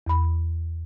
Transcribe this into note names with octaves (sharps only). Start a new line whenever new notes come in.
E2 B5